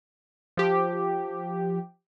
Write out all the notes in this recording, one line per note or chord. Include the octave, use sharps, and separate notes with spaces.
F3 G4